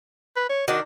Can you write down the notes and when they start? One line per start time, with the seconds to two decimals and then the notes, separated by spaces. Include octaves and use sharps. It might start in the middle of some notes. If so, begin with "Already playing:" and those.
0.37 B4
0.50 C#5
0.68 D#3 D4 F#4